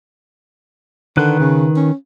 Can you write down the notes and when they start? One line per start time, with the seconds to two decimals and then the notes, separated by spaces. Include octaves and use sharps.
1.17 D3 D#3 B4 F#6
1.40 C#3
1.76 C#4